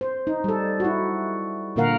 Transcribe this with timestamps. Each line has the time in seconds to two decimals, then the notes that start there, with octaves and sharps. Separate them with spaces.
0.01 C5
0.27 D#4
0.44 G3 A4
0.80 E4 F#4
1.76 A#2 D3 A#3 A#4 F5 F#5